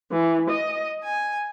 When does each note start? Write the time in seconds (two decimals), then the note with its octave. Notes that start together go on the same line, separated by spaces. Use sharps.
0.11 E3
0.48 D#5
1.04 G#5